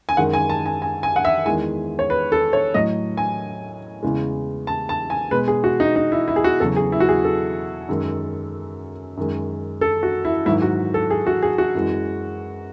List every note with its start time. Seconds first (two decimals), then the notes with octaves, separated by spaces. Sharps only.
0.09 G#5
0.17 F#2 D#3 G#3 F#5
0.33 G#5
0.49 A5
0.66 G#5
0.82 G#5
1.03 G#5
1.16 F#5
1.25 E5
1.46 E2 D#3 G#3 G#5
1.99 C#5
2.10 B4
2.32 A4
2.53 C#5
2.74 A2 F#3 D#5
3.17 G#5
4.03 E2 C#3 E3 G#3
4.67 A5
4.89 A5
5.10 G#5
5.31 B2 G#3 B4
5.48 G#4
5.64 F#4
5.80 D#4
5.96 D#4
6.12 E4
6.28 E4
6.36 G#4
6.44 F#4
6.60 E2 C#3 F#3 A4
6.76 G#4
6.92 E4
7.00 F#4
7.09 G#4
7.24 A4
7.88 F#2 D#3 G#3
9.17 F#2 D#3 G#3
9.81 A4
10.03 F#4
10.25 E4
10.46 G#2 D#3 F#3 E4
10.62 F#4
10.94 A4
11.11 G#4
11.27 F#4
11.43 G#4
11.58 F#4
11.75 F#2 E3 G#3